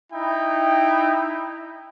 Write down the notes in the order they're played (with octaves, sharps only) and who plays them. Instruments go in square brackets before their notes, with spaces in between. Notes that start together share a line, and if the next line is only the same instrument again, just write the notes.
[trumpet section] D#4 E4 G5